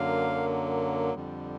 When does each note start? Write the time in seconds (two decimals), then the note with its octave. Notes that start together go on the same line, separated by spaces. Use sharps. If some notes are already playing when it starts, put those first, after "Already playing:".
Already playing: F#2 D3 F#3 A#3 F5
1.15 F2 D3 G3